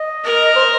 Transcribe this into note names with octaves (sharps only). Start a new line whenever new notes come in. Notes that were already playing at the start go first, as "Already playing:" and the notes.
Already playing: D#5
A#4
C5